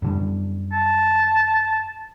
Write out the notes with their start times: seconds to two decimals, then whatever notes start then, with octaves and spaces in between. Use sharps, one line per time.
0.02 F#2 D3 G3
0.72 A5